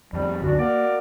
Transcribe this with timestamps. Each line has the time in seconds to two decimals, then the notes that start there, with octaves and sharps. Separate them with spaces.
0.13 F2 D#3 G3
0.42 C#2 F#2 D3 D4 F#4
0.59 A#3 F#4 A#4 D5